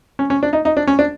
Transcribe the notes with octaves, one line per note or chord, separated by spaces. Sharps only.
C#4
C#4
D4
D#4
D#4
D4
C#4
D4